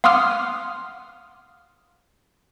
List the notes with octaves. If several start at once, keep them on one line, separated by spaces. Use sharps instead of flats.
F5 F#5 C6 D6 D#6 F6